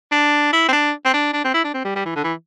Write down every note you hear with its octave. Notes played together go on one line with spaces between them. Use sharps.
D4
E4
C4
D4
C4
D4
D4
C4
E4
D4
C4
G3
G3
E3
D3
E3